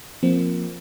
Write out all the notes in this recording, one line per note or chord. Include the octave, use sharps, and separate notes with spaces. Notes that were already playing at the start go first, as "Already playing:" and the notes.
F3 A#3 C4